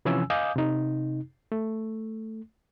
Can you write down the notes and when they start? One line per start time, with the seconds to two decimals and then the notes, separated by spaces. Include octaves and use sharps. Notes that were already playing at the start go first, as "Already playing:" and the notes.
0.05 C3 E3 F3 C#4 G#5 E6
0.30 D#5 F5 G#5 D6 D#6 G6
0.56 C3 D#4
1.52 A3